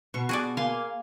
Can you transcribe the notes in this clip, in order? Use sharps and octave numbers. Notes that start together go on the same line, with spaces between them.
B2 C#6
F#4 G#4 D5 G#5
A#3 F5 G#5 C6